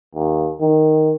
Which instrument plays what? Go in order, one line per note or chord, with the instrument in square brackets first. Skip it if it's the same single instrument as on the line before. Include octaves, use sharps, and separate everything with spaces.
[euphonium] D#2
D#3